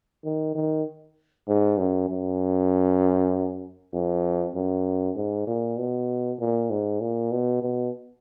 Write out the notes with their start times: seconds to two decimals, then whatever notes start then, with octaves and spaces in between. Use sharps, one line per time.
0.24 D#3
0.55 D#3
1.47 G#2
1.78 F#2
2.09 F#2
3.93 F2
4.55 F#2
5.16 G#2
5.47 A#2
5.77 B2
6.39 A#2
6.70 G#2
7.00 A#2
7.32 B2
7.62 B2